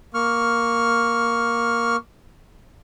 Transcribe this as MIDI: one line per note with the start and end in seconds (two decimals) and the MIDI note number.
0.14 1.96 58
0.14 1.96 85
0.14 1.96 89